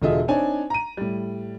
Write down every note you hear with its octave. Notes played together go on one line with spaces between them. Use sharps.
E1 D3 F4 G#4 D#5 E5
C4 D4 D#4 C#5 G#5
A#5 D#7
A2 G3